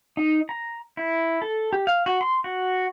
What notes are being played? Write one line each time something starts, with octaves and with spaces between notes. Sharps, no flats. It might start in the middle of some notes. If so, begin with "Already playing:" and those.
D#4
A#5
E4
A4
G4
F5
F#4
C6
F#4